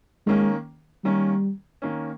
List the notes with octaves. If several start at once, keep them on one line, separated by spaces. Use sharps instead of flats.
D#3 G#3 A#3 C#4
D#3 G3 A#3 C#4
D#3 A#3 C#4